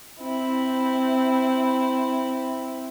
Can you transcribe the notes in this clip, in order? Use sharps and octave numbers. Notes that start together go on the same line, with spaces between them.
C4 E4